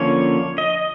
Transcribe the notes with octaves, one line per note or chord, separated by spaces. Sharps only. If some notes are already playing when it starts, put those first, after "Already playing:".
Already playing: D3 F3 A#3 C#4 C#5
D#5